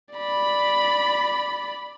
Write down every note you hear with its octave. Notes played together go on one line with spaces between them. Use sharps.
D5 B5